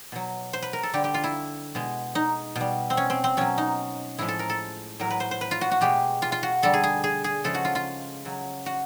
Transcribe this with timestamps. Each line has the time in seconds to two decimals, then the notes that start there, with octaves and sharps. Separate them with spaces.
0.12 B2 F#3
0.53 C5
0.62 B4
0.73 A#4
0.83 A4
0.93 D3 G3 G4
1.04 G4
1.14 F4
1.24 E4
1.75 B2 G#3
2.15 D#4
2.56 B2 G3
2.90 C4
2.97 C#4
3.10 C4
3.24 C4
3.37 B2 F#3 C#4
3.58 D#4
4.18 A2 F3 G#3 E4
4.28 A4
4.39 A#4
4.50 A4
5.00 A2 F#3 A#4
5.10 B4
5.20 C5
5.31 C5
5.41 B4
5.51 F4
5.61 F#4
5.71 F#4
5.81 B2 G#3 G4
6.22 F4
6.32 F4
6.43 F#4
6.62 D3 G3 A4
6.74 G#4
6.84 G#4
7.04 G#4
7.24 G#4
7.44 C#3 F3 G#3 A4
7.54 F#4
7.65 F4
7.75 F4
8.25 C#3 F#3
8.66 F#4